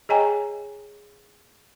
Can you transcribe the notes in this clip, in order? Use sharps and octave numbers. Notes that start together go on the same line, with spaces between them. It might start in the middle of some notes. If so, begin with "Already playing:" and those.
G#4 C#5 D#5 G5 G#5 A#5